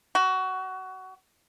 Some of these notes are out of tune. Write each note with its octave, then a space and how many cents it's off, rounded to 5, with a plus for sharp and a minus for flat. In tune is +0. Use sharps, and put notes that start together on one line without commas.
F#4 +20